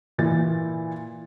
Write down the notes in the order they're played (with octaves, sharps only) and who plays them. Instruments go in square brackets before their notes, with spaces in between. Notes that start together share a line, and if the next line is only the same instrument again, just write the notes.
[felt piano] A#2 E3 A6